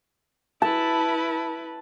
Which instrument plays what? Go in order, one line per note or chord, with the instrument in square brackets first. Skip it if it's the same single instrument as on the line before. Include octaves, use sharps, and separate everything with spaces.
[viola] E4 B4 [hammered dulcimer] A5